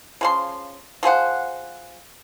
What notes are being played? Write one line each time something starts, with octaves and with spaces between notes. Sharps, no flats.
C#3 F3 C6
F3 G#4 C5 F#5